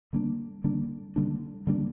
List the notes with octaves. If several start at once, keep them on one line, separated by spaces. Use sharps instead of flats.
D3 G3 A#3 D4
D3 G3 A#3 D4
D3 G3 A#3 D4
D3 G3 A#3 D4